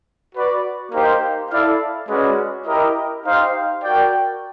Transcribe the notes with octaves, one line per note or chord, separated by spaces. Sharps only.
F#4 B4 D5
A#3 D#4 G4 C5 F5
E4 A4 D5 F5
G#3 C#4 F#4 B4 D5
E4 G4 A#4 D#5
D#4 G4 C5 F5
F#4 A#4 D5 G5